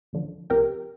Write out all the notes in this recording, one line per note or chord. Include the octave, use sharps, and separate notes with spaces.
D2 D3 F3
C2 C3 F3 G4 A#4